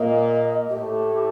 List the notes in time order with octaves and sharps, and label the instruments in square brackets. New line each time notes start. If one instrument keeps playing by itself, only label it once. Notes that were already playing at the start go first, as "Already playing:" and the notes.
Already playing: [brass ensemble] A#2 A#3 [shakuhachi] D#5
[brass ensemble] A2 A3 [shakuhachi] G4